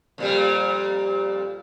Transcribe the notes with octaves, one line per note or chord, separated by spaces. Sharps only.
F2 A#2 G3